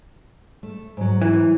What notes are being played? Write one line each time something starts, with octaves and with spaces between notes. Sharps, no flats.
A3
G#2 F#3
E3